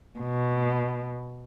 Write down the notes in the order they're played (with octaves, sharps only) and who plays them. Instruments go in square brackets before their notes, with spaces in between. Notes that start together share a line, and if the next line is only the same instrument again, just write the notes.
[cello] B2